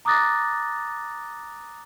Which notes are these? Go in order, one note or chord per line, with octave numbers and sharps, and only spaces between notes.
A#5 D6 D#6 F#6 A6 A#6